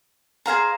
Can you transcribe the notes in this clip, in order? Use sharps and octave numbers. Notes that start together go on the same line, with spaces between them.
G#4 C5 F5 A#5